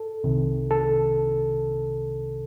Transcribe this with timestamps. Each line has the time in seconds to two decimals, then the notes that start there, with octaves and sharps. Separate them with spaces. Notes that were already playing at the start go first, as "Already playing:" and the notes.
Already playing: A4
0.24 C2 C3 D#3
0.71 A4